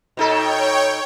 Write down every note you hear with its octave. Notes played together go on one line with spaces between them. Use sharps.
B2 D#4 A4 C#5 G5